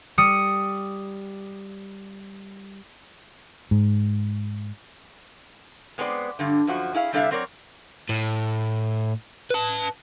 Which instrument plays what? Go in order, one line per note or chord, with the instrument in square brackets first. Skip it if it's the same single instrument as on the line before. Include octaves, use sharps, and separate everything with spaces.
[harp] G3 D#6 C#7
[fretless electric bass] G#2
[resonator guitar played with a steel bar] G#3 B3 C4 B4 D5
G2 D3
F#2 F3 F#4
E4 G#4 F5
C3 G3 D4 A4 E5 F5
F#3 C4 A#4 C#5 D5
[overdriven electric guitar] A2
B4 A5